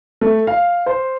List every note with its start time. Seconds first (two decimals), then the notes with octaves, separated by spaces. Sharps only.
0.21 A3
0.47 F5
0.86 C5